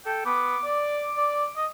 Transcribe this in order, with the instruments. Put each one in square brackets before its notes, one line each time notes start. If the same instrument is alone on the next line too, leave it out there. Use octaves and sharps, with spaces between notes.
[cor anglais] A4 [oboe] G5
[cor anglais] B3 [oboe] D6
[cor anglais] D5
D5
D#5